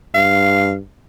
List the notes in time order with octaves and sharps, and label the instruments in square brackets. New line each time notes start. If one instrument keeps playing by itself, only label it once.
[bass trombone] G2 [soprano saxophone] F5